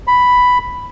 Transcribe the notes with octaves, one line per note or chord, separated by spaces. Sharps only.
B5